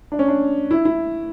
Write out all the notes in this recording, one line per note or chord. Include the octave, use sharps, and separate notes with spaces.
D4
C#4
D4
E4
E4